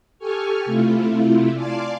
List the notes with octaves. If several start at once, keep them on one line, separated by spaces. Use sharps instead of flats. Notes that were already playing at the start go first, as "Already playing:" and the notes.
G4 A4 G#5 C#6 F6
C3 A3 E4 F4
D5 F5 G#5 A5 C6 D6